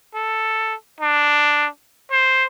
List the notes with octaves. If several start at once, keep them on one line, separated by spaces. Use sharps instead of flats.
A4
D4
C5